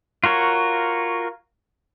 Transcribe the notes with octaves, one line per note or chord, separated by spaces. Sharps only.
F4 F#4 A#4 C#5